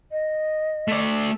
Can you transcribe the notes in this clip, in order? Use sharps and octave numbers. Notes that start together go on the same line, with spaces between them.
D#5
A3 D5